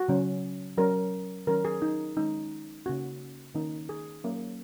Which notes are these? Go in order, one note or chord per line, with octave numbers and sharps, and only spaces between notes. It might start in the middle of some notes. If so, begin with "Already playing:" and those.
Already playing: F#4
C#3 F#3 C#4
F#3 C#4 A#4
D#3 F#3 C#4 A#4
G#4
D#4
D#3 G#3 C#4 D#4
C#3 A#3 C#4 F#4
D#3 A#3 C#4 D#4
G#4
F#3 A#3 C#4